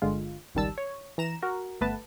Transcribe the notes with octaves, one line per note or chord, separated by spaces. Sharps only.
G1 D3 G#3 F4
G#1 C#2 D#3 G3 A5 E6
C#5
E3 A#5 E7
F#4 A#4
G1 A3 B3 B4 A5